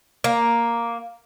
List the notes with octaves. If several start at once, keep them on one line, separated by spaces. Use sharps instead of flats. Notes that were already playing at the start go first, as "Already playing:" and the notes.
A#3